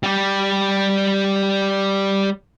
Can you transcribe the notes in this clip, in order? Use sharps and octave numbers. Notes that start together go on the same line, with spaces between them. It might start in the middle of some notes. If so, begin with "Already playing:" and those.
G3 G4